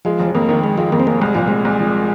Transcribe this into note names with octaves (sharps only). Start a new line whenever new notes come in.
F3 G#3
F1
F2 A#3
D#3
D#3 G#3
F3 G#3
F2 A#3
C4
F1 A#3
C2 G#3
A#2 F3
C2 G#3
C2
F3